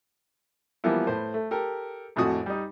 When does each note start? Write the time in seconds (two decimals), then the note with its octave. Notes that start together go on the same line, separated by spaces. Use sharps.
0.84 E3 F3 G3 A#3 B3 E4
1.07 A2 B4 C5
1.34 A3
1.51 G4 A4 A#4
2.16 G#1 F2 A2 D3 F#4 D#6
2.46 G3 D#4